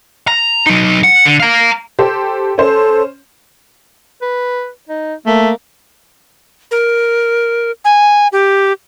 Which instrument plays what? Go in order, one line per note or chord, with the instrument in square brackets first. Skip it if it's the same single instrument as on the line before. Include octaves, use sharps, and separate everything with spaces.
[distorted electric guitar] A#5
F#3 D#4
F#5
D3
F5 A#5
[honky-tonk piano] G4 A4 C5
[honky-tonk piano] C#4 C5 [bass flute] A4
[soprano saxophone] B4
D#4
[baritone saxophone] A3 [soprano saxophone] A#3
[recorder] A#4
G#5
G4